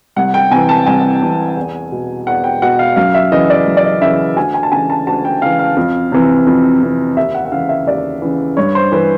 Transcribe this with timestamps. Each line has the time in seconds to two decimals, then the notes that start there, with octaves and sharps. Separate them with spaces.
0.16 C2 F#5
0.34 G5
0.51 C3 E3 G#5
0.69 A5
0.86 C2 G#5
1.22 C3 E3
1.57 E2
1.92 B2
2.27 E2 F#5
2.44 G5
2.62 B2 F#5
2.79 F5
2.96 F#2 F5
3.14 E5
3.32 C#3 E3 D#5
3.50 D5
3.66 F#2
3.77 D5
3.84 D#5
4.02 C#3 E3 E5
4.36 D2 G#5
4.54 G#5
4.63 A5
4.72 C#3 E3 G#5
4.90 A5
5.07 D2 A5
5.25 G5
5.42 C#3 E3 F5
5.59 F5
5.77 F2
6.12 C3 E3
6.47 F2
6.82 C3 E3
7.17 D#2 E5
7.34 F#5
7.45 F#5
7.52 C#3 E3 F5
7.69 E5
7.86 D#2 D5
8.22 C#3 E3
8.57 G2 C#5
8.75 C5
8.92 E3 B4